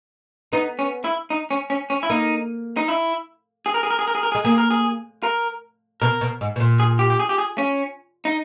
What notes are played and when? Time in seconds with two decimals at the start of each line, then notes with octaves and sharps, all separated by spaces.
0.53 B3 D#4
0.79 C#4
1.04 E4
1.30 D#4
1.51 C#4
1.70 C#4
1.90 C#4
2.03 E4
2.10 A#3 D#4
2.77 D#4
2.88 E4
3.66 G#4
3.74 A#4
3.83 G#4
3.90 A#4
3.99 G#4
4.08 A#4
4.15 G#4
4.23 A#4
4.32 G#4
4.35 G#3
4.45 A#3 G#4
4.58 A#4
4.71 G#4
5.23 A#4
6.02 B2 A#4
6.21 B2
6.41 G#2
6.56 B2
6.60 A#2
6.80 G#4
6.99 G4
7.10 G4
7.19 G#4
7.29 G4
7.38 G#4
7.58 C#4
8.25 D#4